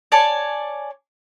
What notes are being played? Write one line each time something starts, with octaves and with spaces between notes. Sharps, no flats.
C#5 D5 G#5 A5